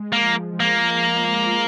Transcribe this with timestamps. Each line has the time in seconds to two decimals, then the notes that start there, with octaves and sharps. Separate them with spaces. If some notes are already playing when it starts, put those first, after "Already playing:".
Already playing: G#3
0.13 A#3
0.21 F3
0.53 F3
0.60 A#3
0.84 F3
1.15 G#3
1.46 F4